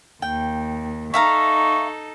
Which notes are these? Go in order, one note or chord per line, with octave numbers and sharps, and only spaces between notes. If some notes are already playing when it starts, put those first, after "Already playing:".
D#2 G5
D#4 A4 E5 F5 A#5 C#6